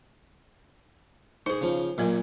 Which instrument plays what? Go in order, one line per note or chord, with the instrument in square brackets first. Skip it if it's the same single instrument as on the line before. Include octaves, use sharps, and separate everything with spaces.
[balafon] D#4 [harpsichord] G#4 C5
[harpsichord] C#3 F3
[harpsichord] A#2 [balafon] F#3 A#3 A#4